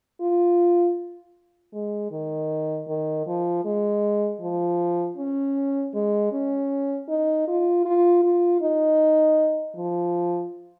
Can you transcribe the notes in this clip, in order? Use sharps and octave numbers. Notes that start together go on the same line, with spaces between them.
F4
G#3
D#3
D#3
F3
G#3
F3
C#4
G#3
C#4
D#4
F4
F4
F4
D#4
F3